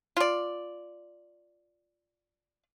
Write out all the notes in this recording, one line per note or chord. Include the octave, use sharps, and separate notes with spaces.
F4 D5